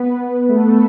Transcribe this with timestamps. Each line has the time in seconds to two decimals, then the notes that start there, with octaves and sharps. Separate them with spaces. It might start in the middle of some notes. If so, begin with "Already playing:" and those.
Already playing: B3 B4
0.49 A3 A4